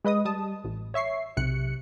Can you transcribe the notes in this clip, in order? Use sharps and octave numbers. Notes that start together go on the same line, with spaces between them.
G#3 B4 D#5 D#6
G3 A5 D#6
A1
C#5 E5 C#6 C7
B1 C3 F#6 C#7